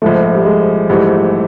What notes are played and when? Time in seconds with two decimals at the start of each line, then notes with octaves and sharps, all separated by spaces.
0.02 A#1 G#2 F3 A3
0.34 G3
0.45 G#3
0.89 A#1 G#2 E3 G3 A3